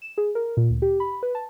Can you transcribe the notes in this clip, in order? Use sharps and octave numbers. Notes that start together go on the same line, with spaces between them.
E7
G#4
A#4
A#2
D2
G4
B5
B4
A5